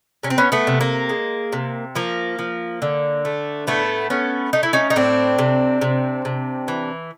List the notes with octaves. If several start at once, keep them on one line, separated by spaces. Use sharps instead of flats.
C3 C#4
C4
B3 C#4
A3 B3
C3
A#3
G#3
C3
F3 A#3
F3
D3
A3
A2 A3 B3
A3 B3 C#4
A3 D#4
E4
C#4 D#4
D#4
A2 C4 D4
C3
C3
C3
E3